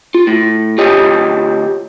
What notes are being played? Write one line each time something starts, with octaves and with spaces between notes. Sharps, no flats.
F4
A2
D2 F4 G4 C#5 D#5